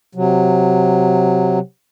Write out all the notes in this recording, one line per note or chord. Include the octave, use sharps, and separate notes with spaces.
C3 F#3